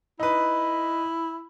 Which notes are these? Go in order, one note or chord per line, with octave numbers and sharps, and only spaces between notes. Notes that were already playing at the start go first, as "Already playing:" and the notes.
D#4 E4 B4